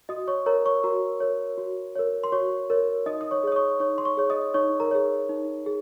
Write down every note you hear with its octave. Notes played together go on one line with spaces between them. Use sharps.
F#4 D#5 D#6
C#5 C#6
A#4 C#5 A#5
C#5 C#6
F#4 A#4 A#5
A#4 C#5
F#4
A#4 C#5
C6
F#4 C#5 C#6
A#4 C#5
D#4 D#5 D#6
D#6
C#5 C#6
G#4 C#5
D#6
C#5 C#6
D#4 C#5 C#6
C6
C#5 C#6
G#4 C#5
D#5 D#6
D#4 C#5 C#6
A#4 A#5
G#4 C#5
D#4
G#4